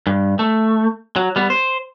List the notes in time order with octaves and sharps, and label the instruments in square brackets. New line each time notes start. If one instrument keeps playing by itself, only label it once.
[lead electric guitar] G2
A3
F#3
G3 B3
C5